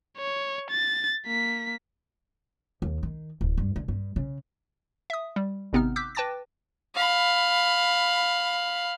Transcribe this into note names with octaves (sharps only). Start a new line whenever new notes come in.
C#5
A6
A#3 B6
D#2
D#3
D1
G2
D3
G2
C#3
E5 D#6
G3
G#1 C3 B3 C4 D#4 F6
D6 E6 F#6 G6 B6
B4 G5 A5 D6 A6 A#6
F5 B5